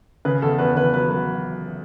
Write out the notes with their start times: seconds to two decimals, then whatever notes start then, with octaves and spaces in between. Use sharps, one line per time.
0.25 C#3 B4
0.42 E2 A4
0.59 E2 B4
0.76 C#3 B4
0.93 F#3 B4
1.10 F#3 B4